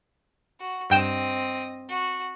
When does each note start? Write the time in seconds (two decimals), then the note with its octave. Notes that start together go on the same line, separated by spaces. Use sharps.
0.60 F#4
0.90 G2 C4 D#5 G5 E7
1.89 F#4